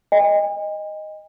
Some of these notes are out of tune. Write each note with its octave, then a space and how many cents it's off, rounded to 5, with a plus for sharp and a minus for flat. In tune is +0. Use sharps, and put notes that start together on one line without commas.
D#5 +0 G#5 -45